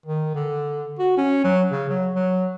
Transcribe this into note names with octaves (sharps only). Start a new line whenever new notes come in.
D#3
D3
F#4
C#4
F#3
C#3
F#3
F#3